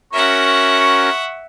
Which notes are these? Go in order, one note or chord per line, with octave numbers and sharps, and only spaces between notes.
C#4 F#4 A#4 E5 F#5 C#6